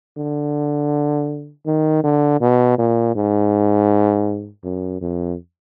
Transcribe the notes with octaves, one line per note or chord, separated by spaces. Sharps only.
D3
D#3
D3
B2
A#2
G#2
F#2
F2